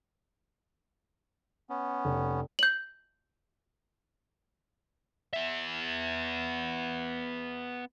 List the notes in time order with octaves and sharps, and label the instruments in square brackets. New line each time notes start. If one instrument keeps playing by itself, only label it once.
[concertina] B3 C#4
[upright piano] F1
[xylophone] G6 F#7
[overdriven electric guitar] B3 E5